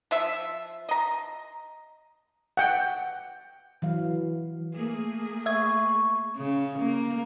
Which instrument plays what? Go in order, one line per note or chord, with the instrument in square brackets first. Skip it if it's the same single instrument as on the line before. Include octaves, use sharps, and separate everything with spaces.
[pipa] F3 E5
D#5 A#5
[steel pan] F#5 G5
[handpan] E3 F#3 F5
[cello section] A3 A#3 G#4
[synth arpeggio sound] E5 G#6 [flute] C#6
[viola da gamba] C#3
A#3